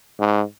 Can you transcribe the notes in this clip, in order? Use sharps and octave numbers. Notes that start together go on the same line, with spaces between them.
G#2